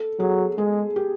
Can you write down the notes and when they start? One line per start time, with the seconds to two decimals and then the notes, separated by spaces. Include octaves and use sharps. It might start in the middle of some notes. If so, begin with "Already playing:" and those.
Already playing: A4
0.19 F#3 G#4
0.58 G#3 G#4
0.96 G4